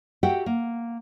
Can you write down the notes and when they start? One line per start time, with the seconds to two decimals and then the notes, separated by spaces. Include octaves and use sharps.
0.23 F#4 G4 A4 E5 F#5 G5
0.46 A#3